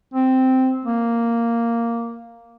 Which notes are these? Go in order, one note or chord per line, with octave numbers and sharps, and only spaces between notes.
C4
A#3